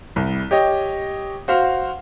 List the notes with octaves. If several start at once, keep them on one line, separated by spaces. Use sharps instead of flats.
C2
G4 C#5 D#5
F#4 C5 F5